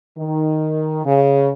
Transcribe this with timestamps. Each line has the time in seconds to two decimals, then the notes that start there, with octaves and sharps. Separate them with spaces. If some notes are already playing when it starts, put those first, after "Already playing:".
0.17 D#3
1.04 C#3